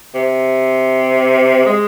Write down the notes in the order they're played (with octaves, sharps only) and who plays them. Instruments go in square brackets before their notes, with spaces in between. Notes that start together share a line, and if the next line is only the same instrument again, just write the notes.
[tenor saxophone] C3
G#3